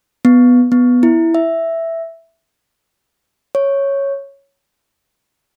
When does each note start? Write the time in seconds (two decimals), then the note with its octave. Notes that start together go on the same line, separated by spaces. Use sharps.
0.25 B3
0.72 B3
1.03 E4
1.35 E5
3.55 C#5